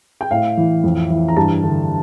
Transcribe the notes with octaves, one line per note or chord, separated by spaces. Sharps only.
G5
A2 F5
E3
F2
E3
A#5
G2 A5
D3